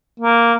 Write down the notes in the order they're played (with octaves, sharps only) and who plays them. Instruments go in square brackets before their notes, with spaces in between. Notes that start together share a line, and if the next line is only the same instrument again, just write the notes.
[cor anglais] A#3